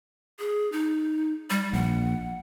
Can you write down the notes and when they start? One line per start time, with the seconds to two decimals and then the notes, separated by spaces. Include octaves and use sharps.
0.39 G#4
0.72 D#4
1.50 G3
1.73 A#1 F#5